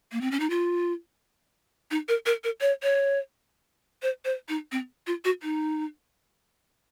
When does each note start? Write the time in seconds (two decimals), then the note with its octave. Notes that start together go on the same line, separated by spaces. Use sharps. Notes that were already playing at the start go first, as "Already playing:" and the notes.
0.12 A#3
0.21 C4
0.31 C#4
0.40 D#4
0.50 F4
1.91 D#4
2.09 A#4
2.26 A#4
2.44 A#4
2.61 C#5
2.83 C#5
4.02 C5
4.25 C5
4.49 D#4
4.72 C4
5.07 F4
5.25 F#4
5.43 D#4